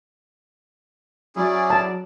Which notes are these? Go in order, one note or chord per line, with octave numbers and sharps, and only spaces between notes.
F#3 C#4 E4 G#4 D5
A5